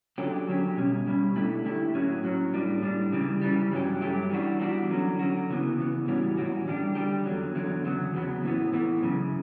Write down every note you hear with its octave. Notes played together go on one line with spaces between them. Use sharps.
D3 F#3 C#4 G4
D3 F#3 C#4 G4
B2 G3 C#4
B2 G3 C#4
D3 A3 E4 G4
D3 A3 E4 G4
A2 F#3 C#4
A2 F#3 C#4
A2 G3 D4
A2 G3 D4
C#3 E3 G3
C#3 E3 G3
G2 F#3 A3 C#4 G4
G2 F#3 A3 C#4 G4
E3 G3 B3 D4 F#4
E3 G3 B3 D4 F#4
D3 F#3 C#4 F#4
D3 F#3 C#4 F#4
C#3 E3 B3
C#3 E3 B3
A2 E3 G3 C#4 F#4
A2 E3 G3 C#4 F#4
D3 G3 D4 G4
D3 G3 D4 G4
E2 D3 F#3
E2 D3 F#3
E2 C#3 F#3 B3
E2 C#3 F#3 B3
A2 E3 B3
A2 E3 B3
F#2 C#3